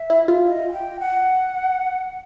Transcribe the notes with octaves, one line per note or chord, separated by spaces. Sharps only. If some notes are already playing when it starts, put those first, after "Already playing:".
Already playing: E5
E4
F4
D#5
G#5
G5
F#5